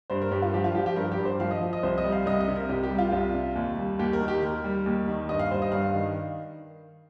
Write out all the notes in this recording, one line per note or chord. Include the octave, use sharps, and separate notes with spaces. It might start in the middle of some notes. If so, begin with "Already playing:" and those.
G2 C5
A#4
G2 G4
F4
F3 G4
F4
F3 G4
G4
G2 A#4
G4
G2
C5
F3 F5
D#5
F3
D#5
C2 C5
D#5
G3
F5
C2 D#5
D#5
C3
A#4
C2 G4
G4
G3
F4
C2
C3
D#2
G3
D#2 G4
A#4
D#3
G4
D#2 A#4
G3
D#2
D#3
G2 D#5
F5
G3 C5
D#5
G2 F5
D#3